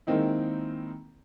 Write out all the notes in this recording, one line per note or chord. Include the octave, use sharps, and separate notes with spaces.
D#3 G#3 A#3 C4 D#4 E4